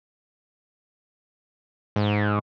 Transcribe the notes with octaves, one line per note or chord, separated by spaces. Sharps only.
G#2